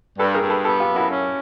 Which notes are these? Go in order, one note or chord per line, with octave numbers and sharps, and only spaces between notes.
G2 A4 B4
G#4 A#4
G2
A4 B4
B3 G4 A4
F4 G4
F#2
E4 F#4
C#4